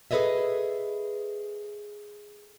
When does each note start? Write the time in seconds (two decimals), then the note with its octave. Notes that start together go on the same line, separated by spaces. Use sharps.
0.11 G#4 A4 B4 C#5 D#5 E5